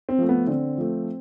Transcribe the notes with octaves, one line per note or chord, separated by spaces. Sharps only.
C4
F3 A3
B3
D3 C4
F3 A3